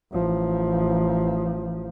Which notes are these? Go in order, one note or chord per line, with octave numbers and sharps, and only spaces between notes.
A1 F3